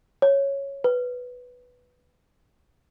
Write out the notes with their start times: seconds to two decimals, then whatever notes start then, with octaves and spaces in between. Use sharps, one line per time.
0.22 C#5
0.84 B4